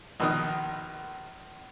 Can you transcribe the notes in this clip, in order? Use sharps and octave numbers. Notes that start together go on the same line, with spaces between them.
A#1 B2 D#3 D#6